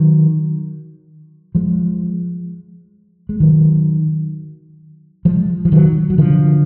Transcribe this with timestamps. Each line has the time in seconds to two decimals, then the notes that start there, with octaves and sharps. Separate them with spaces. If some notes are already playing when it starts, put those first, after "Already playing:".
Already playing: D#3 F#3
1.55 F3 G#3
3.29 G#3
3.40 D#3 F#3
5.25 F3 G#3
5.65 F3
5.72 D#3 F#3
6.10 F#3
6.18 D3 F3